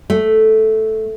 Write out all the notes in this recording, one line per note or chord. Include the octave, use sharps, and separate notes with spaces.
A3